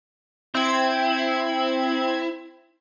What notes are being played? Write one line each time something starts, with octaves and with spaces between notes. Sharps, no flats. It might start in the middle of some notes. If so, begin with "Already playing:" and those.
C4 E4 G#6